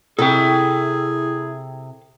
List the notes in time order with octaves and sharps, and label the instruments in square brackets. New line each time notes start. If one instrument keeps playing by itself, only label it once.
[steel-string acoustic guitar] C3 [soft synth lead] E4 [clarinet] G#4 [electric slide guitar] A4 G5